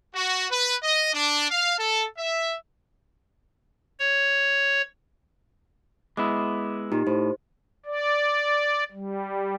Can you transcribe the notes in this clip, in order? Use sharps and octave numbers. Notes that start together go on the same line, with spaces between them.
F#4
B4
D#5
D4
F5
A4
E5
C#5
G#3 B3 E4 D6
A#2 D#4 G4
A2 C5
D5
G3